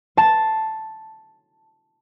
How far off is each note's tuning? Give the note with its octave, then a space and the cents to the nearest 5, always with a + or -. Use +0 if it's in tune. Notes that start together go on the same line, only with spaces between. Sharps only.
A5 +0 C6 +0